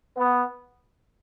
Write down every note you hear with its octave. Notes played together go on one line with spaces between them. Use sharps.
B3